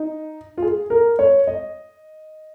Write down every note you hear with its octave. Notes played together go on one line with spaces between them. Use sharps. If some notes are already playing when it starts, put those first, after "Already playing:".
Already playing: D#4
F4
G#4
A#4
C#5
D#5